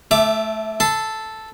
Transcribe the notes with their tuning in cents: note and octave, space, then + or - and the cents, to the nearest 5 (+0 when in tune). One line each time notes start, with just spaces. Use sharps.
A3 -15 E5 +15 D6 +5
A4 +0 C6 -25